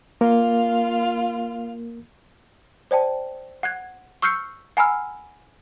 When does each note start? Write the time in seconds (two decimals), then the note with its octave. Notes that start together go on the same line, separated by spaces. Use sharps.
0.21 A#3 F4 A#4 F5
2.91 C5 D5 G5 A5
3.63 F#5 F#6 G#6
4.22 C#6 E6 F6 G6 C7 C#7
4.77 F#5 G#5 A#5 B5 E6 F6